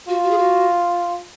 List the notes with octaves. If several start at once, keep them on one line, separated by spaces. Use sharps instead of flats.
F4 F#4
F#4
G#4
F#4